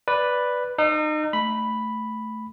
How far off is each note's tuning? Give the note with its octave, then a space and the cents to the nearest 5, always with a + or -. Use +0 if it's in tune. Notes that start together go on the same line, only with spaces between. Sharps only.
B4 +0 D5 +0
D#4 -30 E6 +35
A3 +0 B5 +0